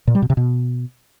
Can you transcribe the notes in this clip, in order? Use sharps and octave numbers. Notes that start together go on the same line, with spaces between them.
A#2
G3
B2
C3
B2